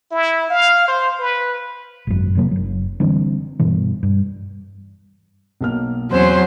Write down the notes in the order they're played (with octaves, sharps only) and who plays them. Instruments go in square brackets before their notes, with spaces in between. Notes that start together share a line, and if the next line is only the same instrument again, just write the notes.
[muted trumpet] E4
F5
C5
B4
[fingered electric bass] G#1 F#2
F1 C3 F#3 A#3
F#1 F#3
D3 E3 G3 C4
G2 B2 E3
G2
[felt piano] B1 A#3 F6
[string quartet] E2 C#4 C6 [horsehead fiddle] F#3 [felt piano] C4 E7 [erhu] C5